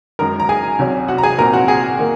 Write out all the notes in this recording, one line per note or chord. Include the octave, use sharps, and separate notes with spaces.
F#2 D#3 G#3 A#4 A#5
A#5
G#4 G#5
C2 C3 F#3 C#4
F#4 F#5
A#5
G#4 G#5
C2 A#2 F#3 C4 A#4 A#5
F#4 F#5
G#4 G#5
D#3 A#3